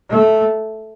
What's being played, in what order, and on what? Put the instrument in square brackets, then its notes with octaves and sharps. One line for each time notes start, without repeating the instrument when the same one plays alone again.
[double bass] A3